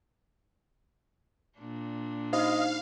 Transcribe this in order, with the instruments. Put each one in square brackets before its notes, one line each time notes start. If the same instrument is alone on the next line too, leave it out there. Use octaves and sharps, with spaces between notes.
[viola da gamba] A#2 D4
[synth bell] D#4 C5 [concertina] D#5 [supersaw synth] F5